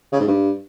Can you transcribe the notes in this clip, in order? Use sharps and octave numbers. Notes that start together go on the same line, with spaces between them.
C#3
G#2
G2